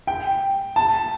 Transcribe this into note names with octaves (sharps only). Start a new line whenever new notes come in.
G5
A5